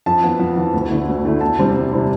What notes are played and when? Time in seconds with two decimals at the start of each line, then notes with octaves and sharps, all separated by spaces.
0.06 F2 A5
0.23 E3 B3
0.39 F2
0.57 E3 B3
0.74 D2
0.90 D3 A3 E4
1.08 D2
1.25 D3 A3 E4
1.41 E2 A5
1.58 C3 G3 C4 E4
1.76 E2
1.92 C3 G3 C4 E4